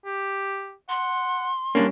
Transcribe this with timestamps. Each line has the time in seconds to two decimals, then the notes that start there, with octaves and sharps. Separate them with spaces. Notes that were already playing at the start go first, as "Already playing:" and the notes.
0.06 G4
0.89 F#5 C6
1.75 G3 A#3 C#4 D4